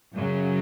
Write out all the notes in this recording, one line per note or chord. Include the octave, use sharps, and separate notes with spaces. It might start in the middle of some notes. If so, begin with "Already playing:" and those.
F#2 C#3 F#3